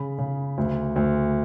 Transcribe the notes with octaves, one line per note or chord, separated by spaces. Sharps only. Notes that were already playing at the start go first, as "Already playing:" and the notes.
Already playing: C#3 B5
C#3
D2
D2